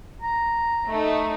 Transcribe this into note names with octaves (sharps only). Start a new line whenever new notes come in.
A#5
A3 D#4